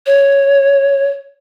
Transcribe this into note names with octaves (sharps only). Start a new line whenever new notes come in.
C#5